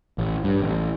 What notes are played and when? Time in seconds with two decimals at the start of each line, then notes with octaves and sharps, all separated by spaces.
0.18 A1
0.44 G2
0.60 A1